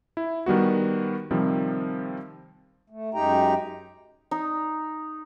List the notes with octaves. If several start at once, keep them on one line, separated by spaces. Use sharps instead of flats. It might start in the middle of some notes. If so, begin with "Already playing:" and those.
E4
D#3 G3 B3 F#4
C3 D#3 F3 G3 C4
A3
F#2 G#3 D#4 G4 G5 A#5
D#4